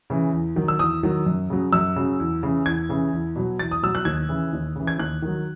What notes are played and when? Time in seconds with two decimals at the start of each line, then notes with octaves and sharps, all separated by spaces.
0.10 C#3 E3
0.33 E2
0.56 D#3 F#3
0.68 E6
0.79 E2 D#6
1.03 D#3 F#3
1.26 F#2
1.50 C#3 F#3
1.73 F#2 E6
1.96 C#3 F#3
2.19 E2
2.42 C#3 E3
2.65 E2 G#6
2.89 C#3 E3
3.13 E2
3.36 B2 F#3
3.59 E2 A6
3.71 D#6
3.82 B2 F#3 E6
3.95 F#6
4.05 D#2 G#6
4.29 C#3 E3
4.53 D#2
4.76 C#3 E3
4.87 G#6
4.98 D#2 F#6
5.22 D#3 F#3